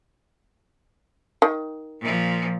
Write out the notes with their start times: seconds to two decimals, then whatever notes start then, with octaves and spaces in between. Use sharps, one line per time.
1.42 D#3
2.01 A#2 F3